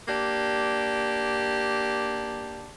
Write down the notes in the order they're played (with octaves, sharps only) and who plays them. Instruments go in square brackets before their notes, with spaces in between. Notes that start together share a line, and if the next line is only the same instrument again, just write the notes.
[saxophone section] A#3 D4 G4